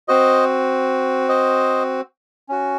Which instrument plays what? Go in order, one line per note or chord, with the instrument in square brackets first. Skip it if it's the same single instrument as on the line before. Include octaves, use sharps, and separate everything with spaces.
[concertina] C4 F#4 C5 D#5
C5 D#5
C#4 F#4